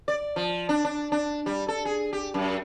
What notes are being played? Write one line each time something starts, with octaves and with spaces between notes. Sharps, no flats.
D5
F3
D4
D4
D4
G3
A4
G#4
G4
F#2